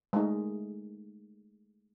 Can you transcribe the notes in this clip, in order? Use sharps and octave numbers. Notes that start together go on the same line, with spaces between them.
G#3 A3 D#4